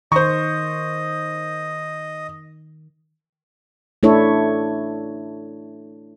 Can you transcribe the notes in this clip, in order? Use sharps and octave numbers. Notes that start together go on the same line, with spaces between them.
D#3 C5 D#5 C#6
A3 D4 E4 A4 C#5